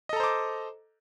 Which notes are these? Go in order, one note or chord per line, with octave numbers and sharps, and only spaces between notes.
A4 C5 D#5 A#5 D6